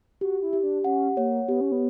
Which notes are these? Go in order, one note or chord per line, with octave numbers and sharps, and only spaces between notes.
F#4 G4
E4
G4
D4
C#4 F#5
A#3 C#5
B3 G4
C#4
B3